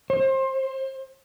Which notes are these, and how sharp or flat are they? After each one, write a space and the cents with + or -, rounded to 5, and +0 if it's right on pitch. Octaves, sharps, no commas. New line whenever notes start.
C5 +25